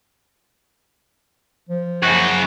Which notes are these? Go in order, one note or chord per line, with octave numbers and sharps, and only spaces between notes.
F3
F#2 C#3 F#4